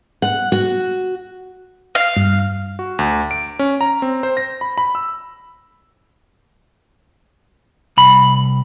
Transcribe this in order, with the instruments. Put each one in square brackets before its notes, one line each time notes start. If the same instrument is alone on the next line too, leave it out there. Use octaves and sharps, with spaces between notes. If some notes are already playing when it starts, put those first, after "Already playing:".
[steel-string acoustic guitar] F#5
F#4
[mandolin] F5
[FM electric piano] G2
[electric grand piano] F#4
D2
D7
C#4
A#5
C4
C5
A#6
B5
B5
E6
[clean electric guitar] C2 B5